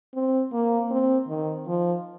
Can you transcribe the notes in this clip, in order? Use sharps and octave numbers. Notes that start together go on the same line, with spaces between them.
C4
A#3
C4
D#3
F3